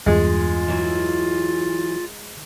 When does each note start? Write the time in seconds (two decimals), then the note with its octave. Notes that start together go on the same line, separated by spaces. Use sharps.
0.07 E2 G2 G#3 F4
0.68 E3 F#3 E4